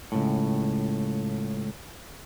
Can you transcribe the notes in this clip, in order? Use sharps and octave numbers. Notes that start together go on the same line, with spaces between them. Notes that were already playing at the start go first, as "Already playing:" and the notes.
C#2 A2